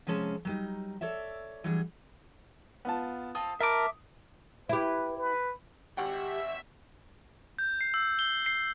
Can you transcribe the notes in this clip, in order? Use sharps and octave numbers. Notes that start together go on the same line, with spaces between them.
C3 F3 G#3 C#4 A5
F#3 G3 D#4
A4 C#5 D5 E5
E3 F#3 G3 D4 G#4
B3 F4 A5
C4 F4 A4 D#6
D#4 A#4 E5 A5 B5 D6
E4 G4 B4
B4
G#1 G4 E5 F#5 G5
G6
C7
E6
G7
C7